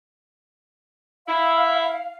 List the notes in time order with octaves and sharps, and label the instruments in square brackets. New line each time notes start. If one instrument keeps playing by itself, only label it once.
[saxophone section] E4 [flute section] F5